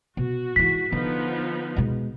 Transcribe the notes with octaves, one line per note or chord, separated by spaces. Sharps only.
B2 F#4
G#2 E3 B6
D3 F3 B3 D#4
B2 G#3